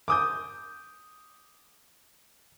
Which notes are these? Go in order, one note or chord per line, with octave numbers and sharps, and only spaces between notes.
D6 D#6 G6